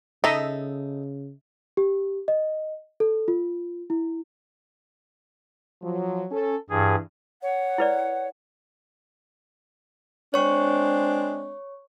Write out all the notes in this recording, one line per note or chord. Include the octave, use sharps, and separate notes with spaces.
C#3 D#4 A4 D#5 E5
G4
D#5
A4
F4
E4
F3 F#3
C#4 A4
G2 E3 G#4
C#5 F#5
E4 B4 D5
G#3 C4 D4 C#5 C#6